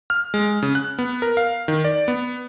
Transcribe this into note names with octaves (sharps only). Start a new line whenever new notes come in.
F6
G#3
C#3
F#6
B3
A#4
F5
D#3
D5
B3